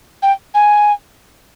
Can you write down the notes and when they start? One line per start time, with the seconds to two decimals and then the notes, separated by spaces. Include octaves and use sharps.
0.22 G5
0.54 G#5